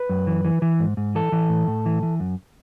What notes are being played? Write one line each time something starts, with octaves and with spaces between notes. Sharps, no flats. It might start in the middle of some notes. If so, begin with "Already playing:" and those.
Already playing: B4
F#2
E3
E3
E3
G#2
G#2
E3 A4
E3
A2
A2
E3
E3
F#2